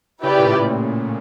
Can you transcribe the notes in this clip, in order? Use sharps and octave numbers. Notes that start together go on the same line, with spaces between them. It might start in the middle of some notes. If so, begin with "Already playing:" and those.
C#3 E4 G4 B4 D5
A#2
A2